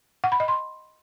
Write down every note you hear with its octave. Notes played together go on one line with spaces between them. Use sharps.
F#5
B5
D#5
C6